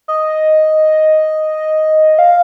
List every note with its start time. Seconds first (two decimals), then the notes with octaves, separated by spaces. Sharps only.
0.08 D#5
2.19 F5